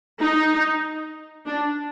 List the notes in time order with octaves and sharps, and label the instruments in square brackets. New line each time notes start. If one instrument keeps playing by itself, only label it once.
[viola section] D#4
D4